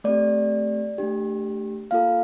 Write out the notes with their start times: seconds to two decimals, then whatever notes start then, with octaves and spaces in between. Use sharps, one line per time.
0.04 A3 C4 G4 D5
0.98 A3 D4 G4
1.91 A#3 F4 A4 F5